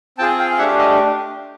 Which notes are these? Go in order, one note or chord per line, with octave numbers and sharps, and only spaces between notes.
C4 F4 G#4 G5 A5
F5 G5
F5
A3 D4 G4 E5 F#5
D#5 F5